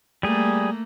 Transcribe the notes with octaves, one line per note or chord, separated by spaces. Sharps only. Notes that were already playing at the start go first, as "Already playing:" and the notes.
G3 A3 A#3 G#4